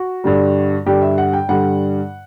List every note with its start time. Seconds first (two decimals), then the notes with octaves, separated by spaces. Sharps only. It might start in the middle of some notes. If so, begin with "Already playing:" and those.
Already playing: F#4
0.24 G2 D3 G3
0.86 G2 D3 G3 G4
1.02 E5
1.18 F#5
1.33 G5
1.49 G2 D3 G3 F#5